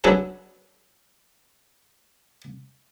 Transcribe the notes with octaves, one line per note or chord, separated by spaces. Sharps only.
F#3 B3 D4 G#4 A4